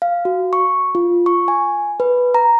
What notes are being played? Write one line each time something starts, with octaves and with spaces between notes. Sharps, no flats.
F5
F#4
C#6
F4
C#6
G#5
B4
A#5